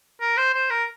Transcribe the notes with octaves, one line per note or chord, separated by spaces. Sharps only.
A#4
C5
C5
A#4